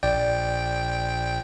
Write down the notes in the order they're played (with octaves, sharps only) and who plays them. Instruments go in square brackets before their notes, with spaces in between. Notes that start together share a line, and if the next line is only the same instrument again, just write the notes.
[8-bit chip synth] A#1 G5 [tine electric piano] D5